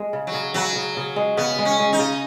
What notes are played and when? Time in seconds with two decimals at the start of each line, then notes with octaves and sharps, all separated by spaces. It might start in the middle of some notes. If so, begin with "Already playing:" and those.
Already playing: G#3
0.13 C#3
0.27 F#3
0.34 C#3
0.54 C#3 F#3
0.75 C#3
0.97 C#3
1.16 G#3
1.37 C#3 B3
1.59 G#3
1.65 C#4
1.79 G#3
1.93 D#4
1.99 C#3